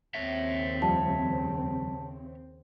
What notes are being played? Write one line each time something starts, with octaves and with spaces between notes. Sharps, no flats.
D#2 C#3 C4 C#5 E5
F2 F3 G3 A5